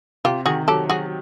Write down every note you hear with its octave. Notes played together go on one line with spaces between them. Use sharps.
C3 F4 G4
D#3 F#4 G#4
F#3 G4 A4
F#3 F#4 G#4